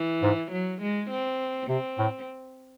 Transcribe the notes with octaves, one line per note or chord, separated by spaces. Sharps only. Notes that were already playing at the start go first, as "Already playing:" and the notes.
Already playing: E3
G#2
F#3
G#3
C4
C3 C4
A2